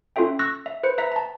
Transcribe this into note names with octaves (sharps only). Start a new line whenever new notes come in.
C#4 F4 F#4 A4 E5 G5
C#6 E6 F#6 A#6
E5
B4 C5 C#7
B4 E5 A#5 B6
A5 A#5